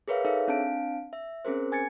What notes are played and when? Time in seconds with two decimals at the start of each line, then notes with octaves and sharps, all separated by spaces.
0.08 G#4 A#4 B4 C#5 E5 F5
0.25 D#4 G#4 A4 C#5 E5 F5
0.48 C4 D4 F5 A5 D7
1.13 E5
1.45 C4 C#4 G#4 A#4 C5
1.72 G#5 G#6 A6 C#7